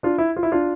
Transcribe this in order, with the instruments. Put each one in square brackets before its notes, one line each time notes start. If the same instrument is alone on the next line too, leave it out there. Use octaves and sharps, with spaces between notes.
[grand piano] D4 F4
E4
F4
E4
D4 F4